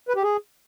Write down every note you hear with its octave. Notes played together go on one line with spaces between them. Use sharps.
B4
G4
G#4